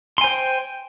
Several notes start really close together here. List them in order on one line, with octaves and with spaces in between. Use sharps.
C6 G#5 C5 G5